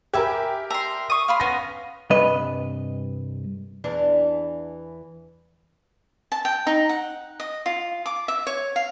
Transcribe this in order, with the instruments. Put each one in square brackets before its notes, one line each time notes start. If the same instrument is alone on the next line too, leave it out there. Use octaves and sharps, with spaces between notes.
[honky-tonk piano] G4 A#4 [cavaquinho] B4 E5 G#5
[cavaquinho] E5 [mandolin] A#5 C6
[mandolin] C#6 D#6
[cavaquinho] F5 B5 C6
[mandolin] B3 C#4 [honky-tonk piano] A#6
[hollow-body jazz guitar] C2 G2 B4 D#5
[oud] E2 E3 D4
[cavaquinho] A5
G5
D#4
F#5
D#5
F4
D6
E5
C#5
F5